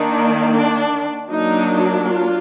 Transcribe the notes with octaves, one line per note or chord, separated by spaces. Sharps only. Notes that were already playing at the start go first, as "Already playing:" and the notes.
Already playing: D#3 A#3 D4 D#4
D4
F#3 A#3 D4 D#4
F4